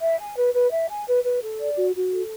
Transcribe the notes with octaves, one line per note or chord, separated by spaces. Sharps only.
E5
G#5
B4
B4
E5
G#5
B4
B4
A4
D5
F#4
F#4
A4